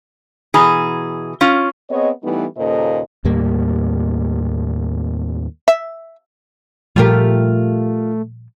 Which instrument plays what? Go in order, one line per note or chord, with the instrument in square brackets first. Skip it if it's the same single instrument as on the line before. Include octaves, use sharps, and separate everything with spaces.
[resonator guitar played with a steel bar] B2 E3 G#4 A#5
C#4 F4
[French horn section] B3 C4 G#4 C#5 D#5
E3 G3 A3 B3 D#4 E4
D#2 A#2 C#3 A4 C5 D#5
[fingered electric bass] D#2 A2 G3 A#3
[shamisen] E5
[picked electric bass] A#2 F3 G3 [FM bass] A3 [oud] F4 G4 A#4